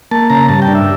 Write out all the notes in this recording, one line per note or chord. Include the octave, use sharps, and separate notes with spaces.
A#3 A5
C#3 A#5
G2 A5
G5
D4
E5